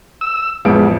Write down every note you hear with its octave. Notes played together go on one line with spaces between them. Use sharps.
E6
A1 F2 G#3 B3 D7